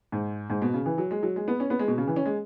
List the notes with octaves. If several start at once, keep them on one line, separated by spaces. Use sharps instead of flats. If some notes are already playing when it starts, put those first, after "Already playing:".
G#2
G#2
B2
C#3
E3
F#3
G#3
F#3
G#3
B3
C#4
B3
G#3
B2
C#3
E3
C#4
G#3